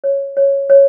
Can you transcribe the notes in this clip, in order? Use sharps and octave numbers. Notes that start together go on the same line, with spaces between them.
C#5
C#5
C#5